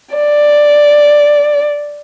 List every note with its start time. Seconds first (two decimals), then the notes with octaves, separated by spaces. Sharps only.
0.16 D5